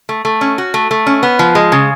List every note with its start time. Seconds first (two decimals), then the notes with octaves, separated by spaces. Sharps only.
0.09 A3
0.25 A3
0.41 C#4
0.58 F#4
0.74 A3
0.91 A3
1.07 C#4
1.23 B3
1.39 F3
1.55 G#3
1.72 C#3